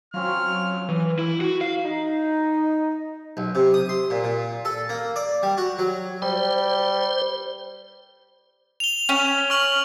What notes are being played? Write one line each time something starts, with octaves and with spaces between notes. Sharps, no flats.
F#3 C4 C#4 F4 F6
E3
E4
F#4
F5
D#4
B1
C3
D#6
C6
A#2
A#2
A4
A#3
D5
G3
F#4
F#3
G3 C5
F7 G7
C#4
C#6 F6 F#7